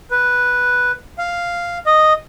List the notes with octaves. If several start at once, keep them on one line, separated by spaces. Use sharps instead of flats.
B4
F5
D#5